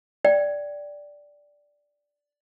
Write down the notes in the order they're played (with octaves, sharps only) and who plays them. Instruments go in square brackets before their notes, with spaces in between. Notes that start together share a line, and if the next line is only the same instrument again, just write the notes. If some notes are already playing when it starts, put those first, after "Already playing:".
[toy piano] D5 G5